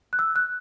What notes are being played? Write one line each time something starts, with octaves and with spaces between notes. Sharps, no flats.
F#6
E6
F#6